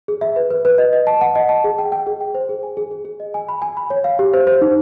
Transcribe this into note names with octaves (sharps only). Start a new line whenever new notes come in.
G#4
E5
B4
B4
B4
D#5
D#5
A5
F#5
D#5
A5
G#4
G5
G5
G#4
G5
C5
G#4
G#5
G#4
G#4
G#4
D#5
G#5
B5
G#5
B5
C#5
F5
G4
C5
C5
D#4